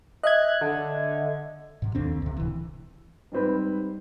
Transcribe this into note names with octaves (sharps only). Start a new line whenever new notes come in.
D#5 E5 F#6 G#6
D3
G#2 C3
F1 D#2 D3 C4
C#2 C3
D1 E3
G#2 G3 C4 B4